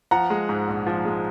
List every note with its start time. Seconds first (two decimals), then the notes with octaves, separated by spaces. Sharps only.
0.11 F3 F#5 A#5
0.30 G#3
0.49 G#2
0.68 A#1
0.87 F3
1.05 G#3